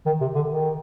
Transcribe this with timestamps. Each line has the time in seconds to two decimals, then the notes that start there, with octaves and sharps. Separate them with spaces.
0.06 D#3
0.21 C3
0.35 D3
0.49 D#3